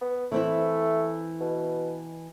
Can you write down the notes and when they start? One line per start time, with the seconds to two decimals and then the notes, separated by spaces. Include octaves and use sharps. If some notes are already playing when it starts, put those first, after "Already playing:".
0.01 B3
0.32 E3 A3 C4 E4
1.41 B2